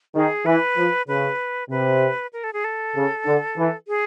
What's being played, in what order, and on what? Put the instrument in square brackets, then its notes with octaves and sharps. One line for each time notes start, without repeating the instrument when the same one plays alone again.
[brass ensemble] D#3 [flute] G#4
[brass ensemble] E3 [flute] B4
[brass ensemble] F3
[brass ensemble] C#3 [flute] B4
[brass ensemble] C3 [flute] B4
[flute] A#4
A4
G#4
A4
[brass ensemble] C#3
D3
E3
[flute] G#4